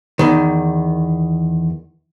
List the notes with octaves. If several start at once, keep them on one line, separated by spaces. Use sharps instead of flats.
E2 D#3